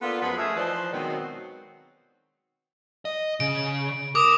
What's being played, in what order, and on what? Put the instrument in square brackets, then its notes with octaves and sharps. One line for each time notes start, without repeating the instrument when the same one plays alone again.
[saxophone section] A#3 B3 D4 F4 A4
F#2 F3 G#3 B3 B4
A3 C#4 G#4 A#4 E5
E3 F3 D#4 B4 C5 D5
B2 D#3 F#3 G#3 B3 C4
[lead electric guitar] D#5
[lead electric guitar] C#3 [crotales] D7
[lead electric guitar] A#4 [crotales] D6 D#6